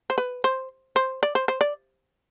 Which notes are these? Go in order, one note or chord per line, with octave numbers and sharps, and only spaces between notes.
C5
B4
C5
C5
D5
C5
C5
D5